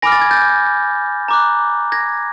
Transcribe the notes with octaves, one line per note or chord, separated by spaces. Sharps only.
G#5 B5 D6 F6 A#6
A6
G#6
G6 A6
A#5 D6 F#6
G#6 A#6